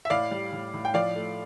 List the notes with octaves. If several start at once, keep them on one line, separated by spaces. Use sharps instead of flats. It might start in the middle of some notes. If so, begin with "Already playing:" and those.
E5
A2 D5 F5
G3
A2
A2
G5
F3 D5 F5
A3